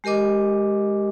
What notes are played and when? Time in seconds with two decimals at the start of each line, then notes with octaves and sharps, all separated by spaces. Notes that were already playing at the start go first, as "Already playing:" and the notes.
0.04 G#3 G4 A#4 D#5 D6